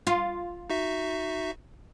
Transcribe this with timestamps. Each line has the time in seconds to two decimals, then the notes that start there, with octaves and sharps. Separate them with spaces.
0.07 F4
0.70 D#4 F#4 E5